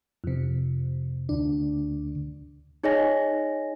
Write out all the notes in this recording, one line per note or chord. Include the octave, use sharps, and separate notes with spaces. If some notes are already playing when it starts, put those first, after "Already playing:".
F2 C3
D2 D4
D#4 G#4 C#5 D#5 G#5 A#6